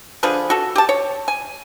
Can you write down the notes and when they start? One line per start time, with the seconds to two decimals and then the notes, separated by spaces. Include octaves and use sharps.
0.23 D3 F3 G#4 B4
0.50 F#4 A4
0.76 G4 A5
0.89 C#5
1.28 G#5